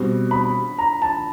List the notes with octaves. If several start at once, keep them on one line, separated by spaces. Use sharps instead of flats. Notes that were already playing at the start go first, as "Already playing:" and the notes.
Already playing: B2 G3 C4
B5
A#5
A5